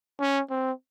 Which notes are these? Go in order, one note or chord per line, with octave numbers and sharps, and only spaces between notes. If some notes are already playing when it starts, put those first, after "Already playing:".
C#4
C4